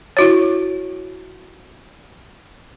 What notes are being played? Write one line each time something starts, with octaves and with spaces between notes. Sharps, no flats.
E4 F#4 C#5